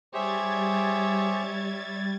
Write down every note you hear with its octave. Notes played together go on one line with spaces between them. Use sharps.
G3 G4 G#4 C5 C#5 E5 G#6 A6